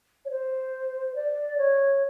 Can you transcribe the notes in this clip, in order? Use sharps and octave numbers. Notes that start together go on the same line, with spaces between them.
C#5
C5
D5
C#5